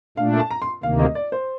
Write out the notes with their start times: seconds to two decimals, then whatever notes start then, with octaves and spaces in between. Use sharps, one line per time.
0.17 A#2 A3 D4 F5
0.40 A5
0.51 A#5
0.62 C6
0.83 D2 C3 D#3 A#3 F5
0.99 D#5
1.15 D5
1.32 C5